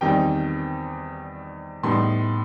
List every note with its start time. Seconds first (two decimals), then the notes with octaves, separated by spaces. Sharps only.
0.01 E2 D#3 G3 C4 D#4 G5
1.83 A2 G3 B3 D#4 C6